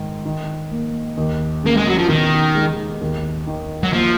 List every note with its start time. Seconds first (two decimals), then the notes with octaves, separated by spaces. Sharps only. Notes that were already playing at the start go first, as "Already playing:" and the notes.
Already playing: G#2 D#3
0.25 D#3
0.71 A#3
1.17 D#2
1.63 C#3 A#3
1.77 G#3
1.88 F#3
1.99 F3
2.09 B2 D#3
2.55 G#3
3.01 D#2
3.47 D#3
3.83 F#3
3.93 F3 A#3